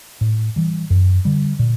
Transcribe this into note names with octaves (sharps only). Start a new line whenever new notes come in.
A2
E3 G3
F#2
D3 G3
A#2